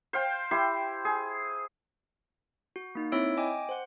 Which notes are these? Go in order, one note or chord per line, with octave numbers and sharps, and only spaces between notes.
C5 F5 G5
E4 G4 C6
G#4
F#4
A#3 D#4
C4 E4 C#5 E5 E6 D7
D#5 G5 G#5 D6
C5 F#5